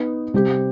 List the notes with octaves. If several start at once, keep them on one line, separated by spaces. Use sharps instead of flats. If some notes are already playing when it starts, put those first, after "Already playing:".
Already playing: B3 D#4 B4
C3 G3 C4 G4